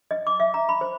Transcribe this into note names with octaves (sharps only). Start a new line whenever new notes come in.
D#5
D6
E5
A#5
B5
C5